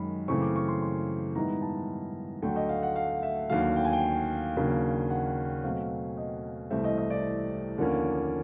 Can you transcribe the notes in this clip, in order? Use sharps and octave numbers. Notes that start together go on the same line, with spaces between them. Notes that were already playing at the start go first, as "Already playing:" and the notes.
Already playing: F#2 D#3 G#3 B5
F#2 C#3 E3 A3 C4 C#6
D6
C#6
C6
C6
G#2 D#3 G3 B3 E4 A#5
A5
D2 D3 F#3 A3 G5
D#5
F5
F#5
F5
E5
D#2 D3 F#3 F5
G5
G#5
G5
D#2 C#3 F#3 A#3 D4
F#5
B2 F#3 A3 C4 F5
D#5
C2 C3 E3 A3 C4 E5
D#5
D#5
D5
D#2 D3 F3 A#3 C#4